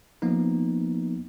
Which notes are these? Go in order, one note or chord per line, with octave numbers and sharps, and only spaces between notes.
F3 A#3 B3 D#4